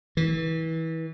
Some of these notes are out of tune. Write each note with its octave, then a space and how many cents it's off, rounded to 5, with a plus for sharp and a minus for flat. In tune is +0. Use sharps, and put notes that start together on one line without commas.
E3 -25